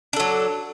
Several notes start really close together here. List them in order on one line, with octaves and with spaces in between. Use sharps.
D4 A4 F#3